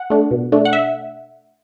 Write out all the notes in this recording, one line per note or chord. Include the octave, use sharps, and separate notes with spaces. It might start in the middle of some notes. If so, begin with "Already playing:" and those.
Already playing: F#5
A3 D4
B2
A3 D4
F#5
E5